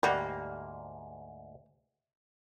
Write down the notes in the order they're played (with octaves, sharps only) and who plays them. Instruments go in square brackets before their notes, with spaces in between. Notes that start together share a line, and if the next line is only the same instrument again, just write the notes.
[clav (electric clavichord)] D2 G#2 A#3 [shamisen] G3 F#4